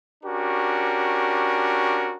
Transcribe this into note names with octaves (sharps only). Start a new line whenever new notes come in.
C#4 D4 F#4 G4 A#4